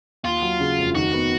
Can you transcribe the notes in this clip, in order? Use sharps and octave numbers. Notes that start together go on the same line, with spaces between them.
D#2 F4
F#3
C#3
F1
D#3 F#4
B3